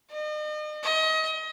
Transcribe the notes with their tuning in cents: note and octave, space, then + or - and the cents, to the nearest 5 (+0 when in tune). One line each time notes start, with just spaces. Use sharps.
D#5 -40
D#5 +30